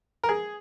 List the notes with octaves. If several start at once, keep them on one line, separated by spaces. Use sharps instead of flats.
A#4
G#4